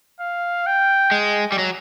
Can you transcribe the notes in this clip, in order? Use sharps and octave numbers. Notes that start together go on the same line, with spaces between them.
F5
G5
G#3
G3
F#3